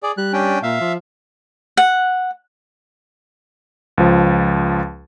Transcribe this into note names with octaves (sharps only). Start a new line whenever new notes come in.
G#4 D5
G3 F#6
C#4 D4 G5
A#2 E5 F5
F3
F#5
C#2 F3